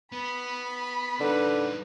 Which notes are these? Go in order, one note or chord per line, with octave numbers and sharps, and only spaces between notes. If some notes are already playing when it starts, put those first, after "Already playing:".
B3 B5
D3 G3 D#4 B4